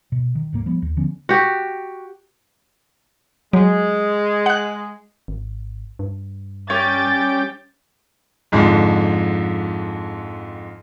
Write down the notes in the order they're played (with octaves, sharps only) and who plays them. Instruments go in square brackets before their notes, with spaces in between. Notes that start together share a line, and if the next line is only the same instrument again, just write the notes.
[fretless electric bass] B2
D#3
D#1 A2 A#3
F3 G3 B3
D#2
D3 F3 B3 C#4
[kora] F#4 G4
[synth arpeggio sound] F#3 [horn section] G#3
[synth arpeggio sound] F#5 F#6
[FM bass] G#1
G2
[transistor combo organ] G3 G5 D6 [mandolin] C#4 [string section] A6
[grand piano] F2 G#2 D3 F3